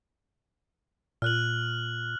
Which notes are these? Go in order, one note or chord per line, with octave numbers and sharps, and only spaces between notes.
A#2 F6 F#6 F#7